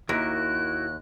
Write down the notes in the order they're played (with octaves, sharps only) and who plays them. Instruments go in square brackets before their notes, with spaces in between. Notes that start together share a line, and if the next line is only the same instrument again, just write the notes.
[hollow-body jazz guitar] D#2 [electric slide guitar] E4 F#4 A#4 [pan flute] F#6